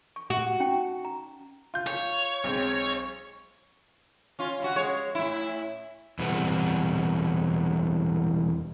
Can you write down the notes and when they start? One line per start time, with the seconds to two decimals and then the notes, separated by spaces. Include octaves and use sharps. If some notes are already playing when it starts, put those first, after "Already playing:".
0.16 C#6
0.30 F#4
0.60 C#4 D#4 G5
1.05 A#5
1.74 F4 G6
1.87 C#5
2.44 B1 G#3 C4
4.39 C#4 F4
4.60 C#4 E4 F#4
4.75 G#3 C#5
5.15 A2 E4
6.19 E2 B2 G3 C4 B4 F#5